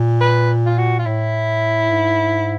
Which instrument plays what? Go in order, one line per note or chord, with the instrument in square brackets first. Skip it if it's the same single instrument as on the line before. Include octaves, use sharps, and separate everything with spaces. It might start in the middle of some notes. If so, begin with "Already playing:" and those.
Already playing: [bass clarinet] A#2
[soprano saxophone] B4
F4
F#4
F4
[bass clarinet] A2 [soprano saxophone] E4
[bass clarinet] G#2